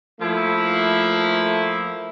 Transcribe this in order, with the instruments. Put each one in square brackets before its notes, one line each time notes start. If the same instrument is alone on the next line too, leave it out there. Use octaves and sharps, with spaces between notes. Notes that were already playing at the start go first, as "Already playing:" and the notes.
[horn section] F3 A3 A#3 E4